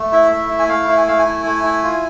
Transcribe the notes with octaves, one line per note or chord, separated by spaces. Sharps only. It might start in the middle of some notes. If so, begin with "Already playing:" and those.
Already playing: A3
E4 E5
A3
E4
G#5
A3 F5
E4
G#5
A3 F5
G#5
E4
A3
E4
F4